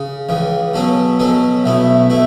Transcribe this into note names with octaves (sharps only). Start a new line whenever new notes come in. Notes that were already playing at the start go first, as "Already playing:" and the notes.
Already playing: C#3
C#2 C#3 E3
B2 F#3 C#4 A4
B2 F#3 C#4 A4
B1 B2 A3 E4
B2 A3 E4